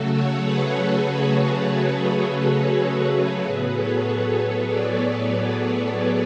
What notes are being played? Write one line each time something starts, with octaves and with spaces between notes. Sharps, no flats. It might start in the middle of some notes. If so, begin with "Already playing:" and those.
Already playing: C#3 F#3 A3 F#4 A4
A4 C#5
G#4 B4
G#4 B4
G#4
F#4 A4
A2 F#3 B3 G#4 B4
A4 C#5
A4 C#5
G#4 B4
B4 D5
B4 D5